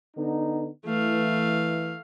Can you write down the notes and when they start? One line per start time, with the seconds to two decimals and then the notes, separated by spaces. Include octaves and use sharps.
0.16 D3 B3 D#4
0.86 E3 A3 F5